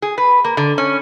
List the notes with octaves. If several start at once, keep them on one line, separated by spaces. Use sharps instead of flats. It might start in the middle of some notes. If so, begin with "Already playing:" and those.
G#4
B4
A#3
D3
C#4